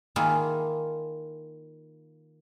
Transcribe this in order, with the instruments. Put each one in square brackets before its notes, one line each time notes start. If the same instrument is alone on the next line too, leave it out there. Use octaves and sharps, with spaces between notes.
[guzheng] D#3 A#3 E4 F4 G#4